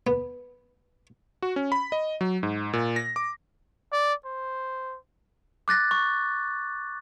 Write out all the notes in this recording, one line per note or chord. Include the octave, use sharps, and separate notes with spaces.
B3
F#4
C#4
B5
D#5
F#3
G#2
A#2
A#6
D6
D5
C5
D6 F#6 A6 A#6
C#6